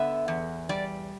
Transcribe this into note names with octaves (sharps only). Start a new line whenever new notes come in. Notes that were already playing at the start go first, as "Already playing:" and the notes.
Already playing: D3 B3 E5
E2
G3 D5